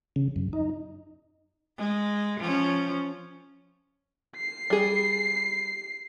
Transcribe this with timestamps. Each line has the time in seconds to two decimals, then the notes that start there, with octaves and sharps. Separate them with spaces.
0.16 C#3
0.36 F#2
0.53 D#4
1.77 G#3
2.40 F3 C#4
4.37 C7
4.70 G3 G#4